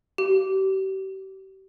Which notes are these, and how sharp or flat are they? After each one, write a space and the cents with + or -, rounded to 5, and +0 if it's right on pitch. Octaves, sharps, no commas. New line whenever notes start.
G4 -40